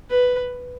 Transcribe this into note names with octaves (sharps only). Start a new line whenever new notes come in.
B4